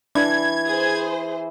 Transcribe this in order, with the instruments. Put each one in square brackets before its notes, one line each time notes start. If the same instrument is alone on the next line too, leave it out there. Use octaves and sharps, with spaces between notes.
[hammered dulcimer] E3 [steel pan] D4 [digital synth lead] G#6
[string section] G#4 C5